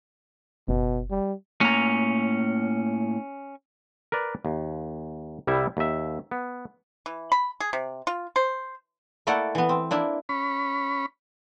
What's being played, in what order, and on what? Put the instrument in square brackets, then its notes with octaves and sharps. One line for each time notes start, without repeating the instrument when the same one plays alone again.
[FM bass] F#1 [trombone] B2
[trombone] G3
[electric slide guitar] A2 A#3 A#5 [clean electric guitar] C#4
[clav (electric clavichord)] A#4 B4 D5
D#2
C2 G3 E4 E5
D#2 E5
B3
[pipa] E3
B5
G#4
C3
F4
C5
[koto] A3 A#3 E4 A4 D5 F#5
E3 B3
C4
A#3 D4 E4
[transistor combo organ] C#4 B5